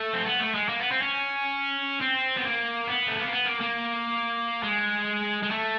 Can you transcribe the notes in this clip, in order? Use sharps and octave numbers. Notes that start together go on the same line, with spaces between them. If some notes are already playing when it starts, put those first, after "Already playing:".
Already playing: A3
C4
B3
A3
G#3
A#3
B3
C4
C#4
C4
B3
A#3
B3
A3
A#3
B3
A#3
A#3
G#3
G#3
A3